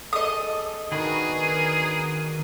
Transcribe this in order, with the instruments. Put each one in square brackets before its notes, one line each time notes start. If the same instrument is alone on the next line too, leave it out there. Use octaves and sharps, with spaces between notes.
[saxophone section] G#4 A4 [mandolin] D#5 D#6
[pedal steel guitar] D#3 F#4 B5 [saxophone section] B3 D4 A#4 [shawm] G#4